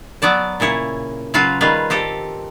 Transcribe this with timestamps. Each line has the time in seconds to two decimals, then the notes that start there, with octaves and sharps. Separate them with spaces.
0.22 F#3 B3 D5 A5
0.60 A#2 C#3 E4 C#5
1.34 C#3 F#3 F4 B4 F5
1.61 D#3 G3 F4 G#4 B4
1.90 C4 G4 A4